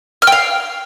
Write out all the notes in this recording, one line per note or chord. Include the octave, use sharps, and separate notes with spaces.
F6
G5
F5